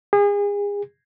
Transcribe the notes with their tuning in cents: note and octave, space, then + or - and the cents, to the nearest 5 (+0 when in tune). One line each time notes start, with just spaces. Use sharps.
G#4 -35